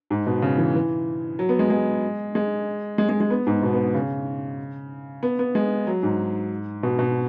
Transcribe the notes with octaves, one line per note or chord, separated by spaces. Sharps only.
G#2
B2
C#3
E3
E3
F#3
B3
G#3
G#3
G#3
G#3
G#3
G#3
B3
G#2
B2
B3
C#3
B3
B3
G#3
F#3
G#2
B2
B2